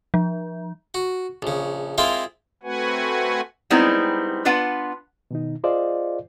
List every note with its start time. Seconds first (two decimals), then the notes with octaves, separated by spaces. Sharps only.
0.14 F3
0.94 F#4
1.42 A#1 C#3
1.98 G#3 A#3 C4 E4 F4 E5
2.63 A3 C4 F#4 B4 F#5 G#5
3.70 G3 G#3 B3 C4 D#4 E4
4.45 B3 D4 F4 B4 F#5
5.31 B2 D#3 D#4
5.64 F4 G#4 C5 D5 D#5 F5